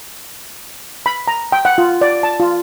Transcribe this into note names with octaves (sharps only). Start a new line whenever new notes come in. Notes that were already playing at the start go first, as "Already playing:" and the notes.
B5
A#5
G5
F#5
F4
D5
A5
F4